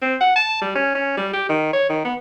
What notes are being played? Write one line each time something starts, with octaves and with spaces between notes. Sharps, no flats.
C4
F#5
A5
G3
C#4
C#4
G3
G4
D#3
C#5
D#3
B3